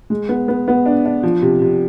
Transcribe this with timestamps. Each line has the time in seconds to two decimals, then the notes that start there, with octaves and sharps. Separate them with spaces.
0.10 G#3
0.29 B3
0.48 B3
0.68 B3
0.86 D4
1.05 D4
1.23 F3
1.42 C3
1.61 C3